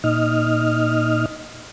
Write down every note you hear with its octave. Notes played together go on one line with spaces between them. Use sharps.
A#2 D#4 D#5 F6